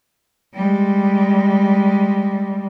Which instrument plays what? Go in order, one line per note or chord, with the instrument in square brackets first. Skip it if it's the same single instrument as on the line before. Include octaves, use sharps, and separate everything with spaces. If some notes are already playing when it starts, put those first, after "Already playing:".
[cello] G3 G#3